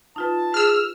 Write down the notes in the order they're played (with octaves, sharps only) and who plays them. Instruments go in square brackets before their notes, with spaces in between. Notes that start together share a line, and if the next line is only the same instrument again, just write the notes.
[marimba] D#4 F4 B4 [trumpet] A5
[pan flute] G#4 [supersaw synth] E6 F6